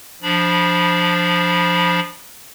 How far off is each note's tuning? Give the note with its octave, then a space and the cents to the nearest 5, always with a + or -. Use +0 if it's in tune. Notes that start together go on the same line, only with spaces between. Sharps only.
F3 +0 D4 +5 B5 -25